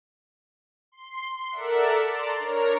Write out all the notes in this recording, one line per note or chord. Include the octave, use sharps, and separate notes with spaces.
C6
A4 A#4 D5 E5 F#5
D5 A5 A#5 C6
D4 A#4 C#5 A#5